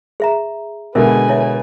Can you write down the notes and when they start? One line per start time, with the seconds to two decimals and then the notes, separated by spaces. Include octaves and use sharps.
0.20 G#4 E5 A#5
0.95 B2 D3 G#3 A#4 B4 E5 G#5
1.29 E4 C#5 E5